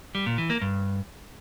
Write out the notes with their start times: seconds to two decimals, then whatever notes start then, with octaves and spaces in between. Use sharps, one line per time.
0.15 G3
0.26 A#2
0.38 E3
0.50 A#3
0.61 G2